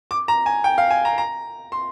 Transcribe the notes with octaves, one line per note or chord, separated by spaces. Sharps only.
D6
A#5
G#5
G5
F5
G#5
A#5
A#5
C6